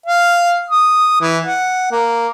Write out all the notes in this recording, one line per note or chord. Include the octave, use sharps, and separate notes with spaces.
F5
D#6
E3
F#5
A#3